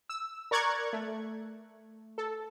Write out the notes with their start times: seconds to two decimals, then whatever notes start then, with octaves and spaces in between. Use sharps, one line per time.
0.09 E6
0.51 A#4 D5 A#5 C#6 F#6 G#6
0.93 A3
2.18 A4